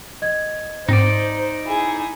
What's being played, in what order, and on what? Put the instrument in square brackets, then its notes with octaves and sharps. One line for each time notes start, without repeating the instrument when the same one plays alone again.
[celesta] D#5 G#6
[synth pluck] G#2 C4 [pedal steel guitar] D#4 D5 [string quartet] C5
[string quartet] E4 G#4